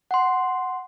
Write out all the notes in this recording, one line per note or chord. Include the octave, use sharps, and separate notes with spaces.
F#5 C6